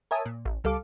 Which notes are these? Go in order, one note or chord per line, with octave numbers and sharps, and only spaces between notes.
A#4 C#5 E5 G#5 A5 D#6
A#2
A1
C#2 G3 A4 F5 D6